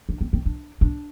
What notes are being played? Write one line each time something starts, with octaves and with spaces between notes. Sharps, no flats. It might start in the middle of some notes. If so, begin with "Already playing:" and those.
D4
C4
C4
D4
D4